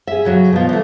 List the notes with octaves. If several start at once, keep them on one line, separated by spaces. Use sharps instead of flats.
G#4 E5
C#3 F#3 F#4
B2 F3
E3 A3